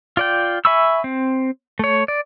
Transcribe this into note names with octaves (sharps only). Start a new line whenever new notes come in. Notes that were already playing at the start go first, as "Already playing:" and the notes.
F4 D5 G5
E5 G#5 B5 C#6 E6
C4
A3 C#5
D5